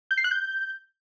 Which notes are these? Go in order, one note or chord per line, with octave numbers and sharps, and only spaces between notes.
G6
C7
F#6
G6